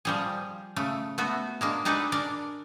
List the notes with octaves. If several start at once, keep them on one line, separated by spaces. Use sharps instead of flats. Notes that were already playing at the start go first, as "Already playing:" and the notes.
F3 G3 G#4
C#3 A3
A3 B3 F#4
G#3 A#3 D4
D4 D#4 G#4 A4 B4
D4 A#4 D5